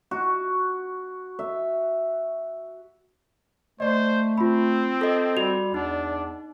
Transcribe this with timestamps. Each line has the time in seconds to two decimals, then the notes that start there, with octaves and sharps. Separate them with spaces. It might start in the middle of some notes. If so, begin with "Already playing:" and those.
0.11 F#4
1.39 E5
3.80 A3 C5 D5 D#5
4.38 C4 F4 B5
5.01 A4 D#5
5.37 G3 F#4 F7
5.74 E2 D4 D#4